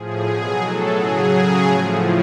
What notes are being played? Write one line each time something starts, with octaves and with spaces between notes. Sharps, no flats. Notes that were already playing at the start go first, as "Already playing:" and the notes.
Already playing: A2 F3 G#4
B2 F#3 G#4
A2 F#3 A4
C#3 F#3 G#4
C#3 F#3
A2 F3